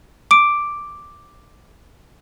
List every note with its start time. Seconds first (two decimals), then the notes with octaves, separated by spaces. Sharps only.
0.31 D6 D7